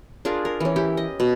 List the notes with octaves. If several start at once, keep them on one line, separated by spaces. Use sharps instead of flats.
D4 F4 G#4 A#4
A#4
E3 C#4
E4 G4
D#5
B2